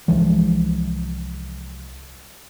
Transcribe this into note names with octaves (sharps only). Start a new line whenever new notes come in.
C2 E3 F3 G#3